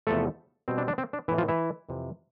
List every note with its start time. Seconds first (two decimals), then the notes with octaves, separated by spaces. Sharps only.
0.07 E2 C3 F3 A3 B3 A4
0.68 B2 G3 C4
0.78 D4
0.88 D4
0.98 C4
1.13 D4
1.28 E3 B3 E4
1.31 A2
1.38 F3 F4
1.48 E3 E4
1.89 F2 C3 E3